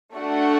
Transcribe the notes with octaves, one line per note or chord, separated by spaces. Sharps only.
A3 D4 F#4 A4 F#5